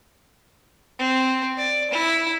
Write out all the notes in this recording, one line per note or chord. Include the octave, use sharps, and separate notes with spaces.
C4
D5
E4